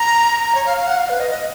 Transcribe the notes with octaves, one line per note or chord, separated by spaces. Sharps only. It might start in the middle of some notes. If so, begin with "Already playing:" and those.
Already playing: A#5
C#5
F5
F5
F#5
F5
B4
D#5
D#5